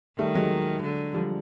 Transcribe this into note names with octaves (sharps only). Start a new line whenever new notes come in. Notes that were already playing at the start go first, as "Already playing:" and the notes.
D#3 G3 A3
F#3 G#3
D3
F3 G3